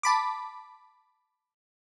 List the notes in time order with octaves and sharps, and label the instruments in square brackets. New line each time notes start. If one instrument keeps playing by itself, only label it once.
[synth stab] A5 B5 D6